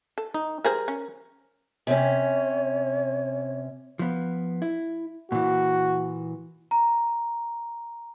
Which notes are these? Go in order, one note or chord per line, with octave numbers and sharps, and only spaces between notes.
A4
D#4
G3 G#4 A#4 C5
C#4
C3 C#4 C#5
F3 B3
E4
A#2 E3 F#4
A#5